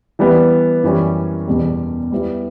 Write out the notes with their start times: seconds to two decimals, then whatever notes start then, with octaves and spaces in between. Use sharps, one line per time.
0.19 E3 G3 B3
0.83 F#2 E3 G3 C#4
1.47 E2 B2 G3
2.12 G3 B3 E4